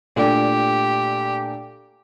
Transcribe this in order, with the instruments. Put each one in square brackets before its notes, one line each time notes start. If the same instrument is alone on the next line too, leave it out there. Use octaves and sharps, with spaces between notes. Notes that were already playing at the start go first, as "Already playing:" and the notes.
[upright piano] A#2 A3 D4 [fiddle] G4